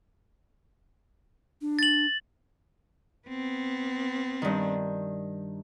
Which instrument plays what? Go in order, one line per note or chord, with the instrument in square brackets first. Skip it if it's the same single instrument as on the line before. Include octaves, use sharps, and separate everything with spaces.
[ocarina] D4
[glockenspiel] A6 F#7
[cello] B3 C4
[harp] G2 D#3